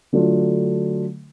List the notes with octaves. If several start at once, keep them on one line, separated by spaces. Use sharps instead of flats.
D3 F#3 A3 D4 F4